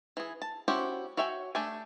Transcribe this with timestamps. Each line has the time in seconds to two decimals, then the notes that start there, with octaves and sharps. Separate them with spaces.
0.17 E3 G#4
0.42 A5
0.68 C#4 E4 F#4 G4 C5
1.17 F#4 C#5 E5 G5 G#5
1.55 A3 D4 G4 E5 G#5